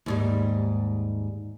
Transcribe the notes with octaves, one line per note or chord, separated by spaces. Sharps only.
D#2 G#2 G3